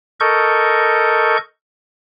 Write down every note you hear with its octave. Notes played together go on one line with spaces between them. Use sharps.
A4 A#4 D#5 C#6 G6